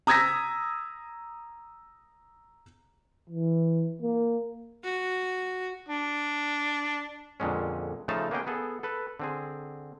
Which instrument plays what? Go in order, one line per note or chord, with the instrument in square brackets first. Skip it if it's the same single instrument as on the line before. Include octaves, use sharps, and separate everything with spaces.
[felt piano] A#5 D#6 E6 G#6 A#6 B6
[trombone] E3
A#3
[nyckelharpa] F#4
[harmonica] D4
[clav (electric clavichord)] F2 A#2 D3 G#3 C#4
C#3 F3 A3 D#4 F5 A5
A#3 B3 C#4 G#4 D#5 G5
B3 G#4 A4
A4 B4
D3 C4 G#4